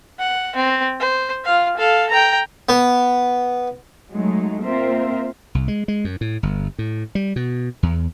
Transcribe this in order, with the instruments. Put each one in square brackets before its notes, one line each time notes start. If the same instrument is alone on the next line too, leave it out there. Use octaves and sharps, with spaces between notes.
[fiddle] F#5
C4
C5
F4 F5
A4 F5
G5 A#5
[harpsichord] B3
[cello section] F#3 G#3 A3 D#4
A#3 C4 F4 A#4 C5 E5
[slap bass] C2
G#3
G#3
F#2
A2
G1
A2
G3
B2
E2